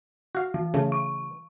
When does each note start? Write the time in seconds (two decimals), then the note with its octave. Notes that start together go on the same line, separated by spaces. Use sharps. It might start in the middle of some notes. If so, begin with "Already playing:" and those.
0.35 F#4 F5
0.54 E3
0.74 C#3 A3
0.92 C#6